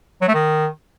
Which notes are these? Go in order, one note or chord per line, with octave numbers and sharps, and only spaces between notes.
F#3
A3
D#3